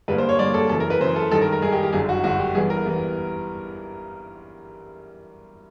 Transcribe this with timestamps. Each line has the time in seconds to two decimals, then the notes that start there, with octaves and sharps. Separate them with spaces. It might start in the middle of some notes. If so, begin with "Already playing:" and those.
0.08 G2 D3 G3 A#3 B4
0.18 C5
0.29 C#5
0.39 G2 D3 G3 A#3 D5
0.54 A4
0.69 F#2 C#3 E3 A4
0.80 A#4
0.90 B4
1.00 F#2 C#3 E3 C5
1.16 A4
1.31 G2 D#3 G#3 A4
1.42 A#4
1.52 A#4
1.62 G2 D#3 G#3 G#4
1.72 G4
1.83 G4
1.92 G1 F#2 D3 G#4
2.09 F#4
2.24 G1 F#2 D3 F#4
2.39 G4
2.55 G2 E3 G3 B3 G#4
2.70 A#4
2.86 E3 G3 B3